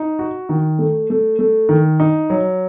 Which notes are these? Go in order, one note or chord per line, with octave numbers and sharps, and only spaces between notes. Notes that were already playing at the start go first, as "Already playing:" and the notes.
Already playing: D#4
F#4
D#3
A3
A3
A3
D#3
D#4
F#3